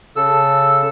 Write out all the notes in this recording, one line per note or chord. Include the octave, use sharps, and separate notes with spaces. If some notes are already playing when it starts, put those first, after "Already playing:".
C#3 A4 E6